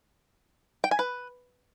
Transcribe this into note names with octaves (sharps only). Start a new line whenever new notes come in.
G5
G#5
B4